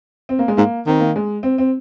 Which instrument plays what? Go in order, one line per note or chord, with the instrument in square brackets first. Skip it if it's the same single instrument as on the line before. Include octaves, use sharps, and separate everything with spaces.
[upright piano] C4
A#3
G#3
[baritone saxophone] G#2 [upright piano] A#3
[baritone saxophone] D#3 [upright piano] C4
[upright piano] A#3
G#3
C4
C4